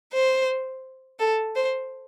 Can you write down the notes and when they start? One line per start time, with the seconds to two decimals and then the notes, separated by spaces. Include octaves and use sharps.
0.13 C5
1.19 A4
1.56 C5